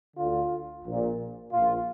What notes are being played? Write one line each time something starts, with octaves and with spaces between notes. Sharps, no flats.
D2 D3 F4
A#1 A#2
A#1 A#2 F4